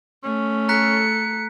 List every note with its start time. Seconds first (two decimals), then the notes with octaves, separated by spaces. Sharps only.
0.24 A3 C#4
0.69 A4 A#5 F#6 B6 C#7